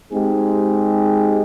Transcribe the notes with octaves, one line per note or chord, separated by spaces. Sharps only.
G#3 C4 D#4 G4 G#4